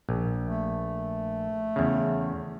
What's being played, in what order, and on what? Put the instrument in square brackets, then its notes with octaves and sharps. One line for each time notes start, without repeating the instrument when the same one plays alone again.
[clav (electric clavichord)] A#1
[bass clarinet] A3
[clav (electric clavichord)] E2 C#3